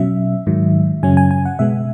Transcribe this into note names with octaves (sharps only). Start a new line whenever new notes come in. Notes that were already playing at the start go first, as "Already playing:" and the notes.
Already playing: B2 F#3 C#4 E5
G#2 D#3 F#3
F#2 C#3 F#3 C#4 G#5
G#5
G#5
F#5
B2 G#3 B3 E5